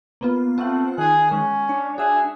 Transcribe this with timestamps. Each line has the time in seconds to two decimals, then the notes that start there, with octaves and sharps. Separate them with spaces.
0.21 A#3 B3 F4
0.58 A3 C4 F4 F#5
0.98 D#3 G#4 F#6
1.32 G#3 C#4
1.69 D4 C#5
1.98 F#4 G#4 E5